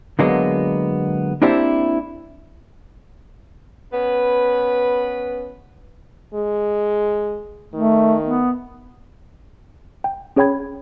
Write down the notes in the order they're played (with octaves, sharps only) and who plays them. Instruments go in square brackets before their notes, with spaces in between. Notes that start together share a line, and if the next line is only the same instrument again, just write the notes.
[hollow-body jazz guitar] D3 F#3 G#3 A#3 B3
A#3 C4 D4 E4 G4 C5
[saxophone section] B3 C#4 B4
[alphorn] G#3
[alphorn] D#3 [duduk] A3
[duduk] B3
[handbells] G5
C#4 G#4 C#5 G5 B5 G#6